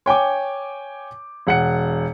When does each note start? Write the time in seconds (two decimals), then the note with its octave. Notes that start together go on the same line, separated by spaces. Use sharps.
0.06 C#5 G5 G#5 D6
1.47 E1 F#5 C#7